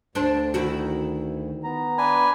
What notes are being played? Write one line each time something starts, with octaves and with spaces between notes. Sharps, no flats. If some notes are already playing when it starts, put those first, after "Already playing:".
D2 D4 A4 C5
D#3 E4 F#4
B3 A#5
D4 B4 G#5